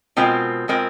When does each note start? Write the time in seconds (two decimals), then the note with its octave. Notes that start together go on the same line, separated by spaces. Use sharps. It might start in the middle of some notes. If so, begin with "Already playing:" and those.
0.17 B2 G#3 C4 F4 A#4
0.68 B2 G#3 C4 F4 A#4